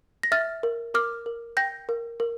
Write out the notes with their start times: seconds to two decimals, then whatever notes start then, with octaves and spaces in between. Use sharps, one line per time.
0.23 A#6
0.32 E5 F6 A6
0.63 A#4
0.94 A#4 D6 F6
1.26 A#4
1.57 G5 G6 A#6
1.89 A#4
2.20 A#4